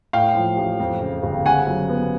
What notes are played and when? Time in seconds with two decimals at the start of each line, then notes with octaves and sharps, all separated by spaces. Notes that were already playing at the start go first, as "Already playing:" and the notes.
0.13 A2 F5 G5
0.35 F3
0.57 A1
0.80 F2
1.01 C#3
1.23 G1
1.45 C#3 F#5 G#5
1.67 F#3
1.89 B3